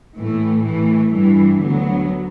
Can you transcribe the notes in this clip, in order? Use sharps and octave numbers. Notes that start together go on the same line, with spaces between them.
A2 E3 A3
A2 E3 A3
G2 E3 G3 D4
D2 D3 F#3 B3